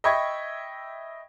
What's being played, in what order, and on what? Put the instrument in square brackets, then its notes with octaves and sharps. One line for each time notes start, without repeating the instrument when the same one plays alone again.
[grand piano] D#5 E5 G5 B5 C#6 G#6